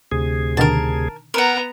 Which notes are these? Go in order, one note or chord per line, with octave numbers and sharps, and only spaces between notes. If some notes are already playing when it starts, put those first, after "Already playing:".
D2 C3 G#4
B2 D3 D#3 A#4 A5
B3 A#4 F#5 A#5